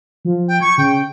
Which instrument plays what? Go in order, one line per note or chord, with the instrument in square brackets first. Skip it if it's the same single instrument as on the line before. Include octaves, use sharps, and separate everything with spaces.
[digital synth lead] F3
[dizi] G5
[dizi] C#6 [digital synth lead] G#6
[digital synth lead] C#3 [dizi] G5